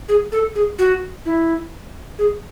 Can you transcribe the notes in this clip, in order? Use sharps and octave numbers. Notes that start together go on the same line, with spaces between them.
G#4
A4
G#4
F#4
E4
G#4